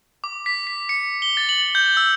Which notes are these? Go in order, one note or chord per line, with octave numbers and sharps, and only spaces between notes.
D6
B6
B6
C#7
G7
A6
F#7
G6
E6